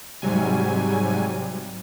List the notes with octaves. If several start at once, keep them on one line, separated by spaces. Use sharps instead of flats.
G#2 C3 F#3 G3 G#5